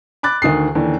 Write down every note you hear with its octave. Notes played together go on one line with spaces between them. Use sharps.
B5 D6 F#6 A6
D2 D#3 D#6 C7
D#2 D3 E3